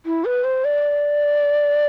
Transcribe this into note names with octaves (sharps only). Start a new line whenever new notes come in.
E4
B4
C5
D5